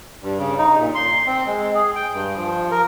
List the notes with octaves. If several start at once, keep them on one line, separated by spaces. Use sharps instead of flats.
G2
C#3
D#4
A#2
C6
C4
G#3
G#4
G5
G2
F3
A#4